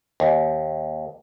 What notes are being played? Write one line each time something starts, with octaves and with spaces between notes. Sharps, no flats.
D#2